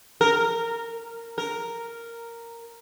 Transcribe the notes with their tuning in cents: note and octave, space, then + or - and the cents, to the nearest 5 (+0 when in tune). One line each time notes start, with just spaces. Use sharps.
A#4 -15
A#4 -5